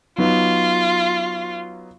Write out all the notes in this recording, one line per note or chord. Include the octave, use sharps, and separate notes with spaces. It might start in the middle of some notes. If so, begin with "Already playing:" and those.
F#3 B3 D#4 F4